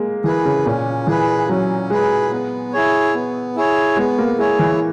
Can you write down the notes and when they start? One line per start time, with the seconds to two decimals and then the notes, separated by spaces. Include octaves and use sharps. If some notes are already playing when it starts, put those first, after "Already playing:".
Already playing: G#3 A#3
0.24 E3 G#4 B4
0.45 C#3
0.66 A#2 C#4
1.07 E3 G#4 B4
1.49 F#3 C#4
1.90 G#3 G#4 B4
2.31 B3
2.73 E4 G#4 C#5
3.15 B3
3.56 E4 G#4 C#5
3.97 G#3 B3
4.19 A#3
4.38 G#3 E4 G#4 C#5
4.59 E3